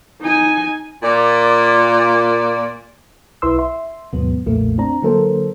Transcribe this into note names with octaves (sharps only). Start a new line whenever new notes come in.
D#4 G#5
A#2 D5
B1 E4 B4 C6 E6
E5 C6
D#2 G#2 B2 F#3 B3
B1 F2 A#2 A3 A#3
C4 D4 A#5
D3 F#3 A#3 A4 A#4 C5